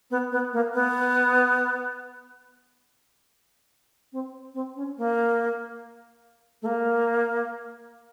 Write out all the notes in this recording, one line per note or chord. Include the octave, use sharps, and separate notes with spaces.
B3
B3
A#3
B3
C4
C4
C#4
A#3
A3
A#3